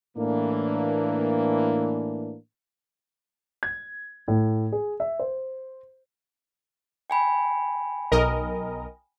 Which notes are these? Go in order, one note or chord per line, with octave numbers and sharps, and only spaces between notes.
A2 E3 A#3 D4
G#6
A2
G#4
E5
C5
G5 G#5 B5
B1 A#4 D#5